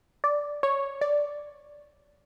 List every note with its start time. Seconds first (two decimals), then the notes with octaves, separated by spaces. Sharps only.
0.24 D5
0.63 C#5
1.01 D5